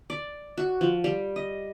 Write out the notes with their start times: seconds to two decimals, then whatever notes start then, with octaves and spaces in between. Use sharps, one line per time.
0.10 D5
0.58 F#4
0.81 F3
1.04 G3
1.36 D#5